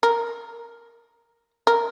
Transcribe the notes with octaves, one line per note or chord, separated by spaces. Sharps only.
A#4
A#4